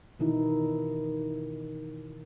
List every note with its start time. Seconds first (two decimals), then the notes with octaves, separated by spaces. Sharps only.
0.19 B2 D#3 E3 D#4 E4